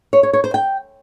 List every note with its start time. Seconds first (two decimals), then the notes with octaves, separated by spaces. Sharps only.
0.13 C#5
0.23 C#5
0.33 C#5
0.44 C5
0.54 G5